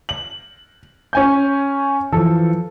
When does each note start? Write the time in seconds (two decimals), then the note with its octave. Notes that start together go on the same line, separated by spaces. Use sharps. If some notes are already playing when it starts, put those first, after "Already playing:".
0.09 F#7
1.13 C#4 G#5 G6
2.12 E3 F3 A4